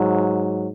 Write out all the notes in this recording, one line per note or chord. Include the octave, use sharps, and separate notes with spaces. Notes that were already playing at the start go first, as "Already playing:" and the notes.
Already playing: G#2 F#3